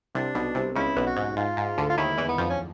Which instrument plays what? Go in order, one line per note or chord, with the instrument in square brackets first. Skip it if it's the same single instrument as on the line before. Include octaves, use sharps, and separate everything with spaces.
[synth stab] C2 C3 [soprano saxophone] D4
[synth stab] B1 B2
C2 C3
[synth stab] C#2 C#3 [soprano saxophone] E4
[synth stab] B1 B2
[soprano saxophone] F#4
[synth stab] G#2
[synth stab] G#2 [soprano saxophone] F4
[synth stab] G#2
D2 D3
[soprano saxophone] F4
[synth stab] D#2 D#3 [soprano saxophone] E4
[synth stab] E2 E3
[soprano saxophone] B3
[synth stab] F2 F3
[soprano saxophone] C#4